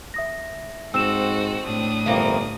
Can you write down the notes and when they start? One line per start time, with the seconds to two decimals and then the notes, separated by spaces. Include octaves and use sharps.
0.14 E5 D#6 A#6
0.94 G#2 C4 F#4 A4 E6 E7
1.66 A2 D4 D#6
2.06 G1 E3 A#3 C4